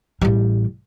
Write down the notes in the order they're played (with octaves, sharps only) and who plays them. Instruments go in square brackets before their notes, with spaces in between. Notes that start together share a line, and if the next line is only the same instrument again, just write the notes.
[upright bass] A1 G3